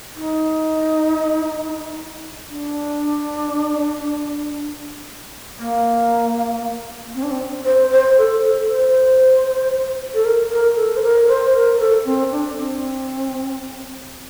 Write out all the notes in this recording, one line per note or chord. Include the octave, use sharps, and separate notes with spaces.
D#4
D4
A#3
C4
D4
C4
C5
C5
A4
A4
C5
A4
A#4
A#4
A4
C5
A#4
C5
A#4
A#4
A4
C4
D4
C4